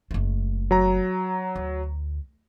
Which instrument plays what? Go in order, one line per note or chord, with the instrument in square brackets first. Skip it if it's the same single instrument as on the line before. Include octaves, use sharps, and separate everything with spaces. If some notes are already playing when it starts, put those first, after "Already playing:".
[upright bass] F#1 A3
[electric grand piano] F#3 A#5
[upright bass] D2